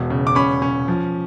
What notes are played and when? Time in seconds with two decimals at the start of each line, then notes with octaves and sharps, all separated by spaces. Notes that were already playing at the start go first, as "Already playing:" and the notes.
Already playing: E1 B2
0.10 C#3
0.27 D6
0.35 C#4 B5 C#6
0.62 C#4
0.88 F3